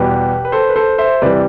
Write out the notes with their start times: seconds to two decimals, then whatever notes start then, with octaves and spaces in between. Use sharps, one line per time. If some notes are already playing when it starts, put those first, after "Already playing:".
Already playing: E2 B2 G3 B3 G4 B4
0.45 B4
0.52 A4 C5
0.69 B4
0.76 A4 C5
0.98 C5 E5
1.22 C3 E3 G3 B4 D5